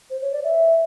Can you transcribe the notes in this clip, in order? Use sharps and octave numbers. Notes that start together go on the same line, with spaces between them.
C5
C#5
D5
E5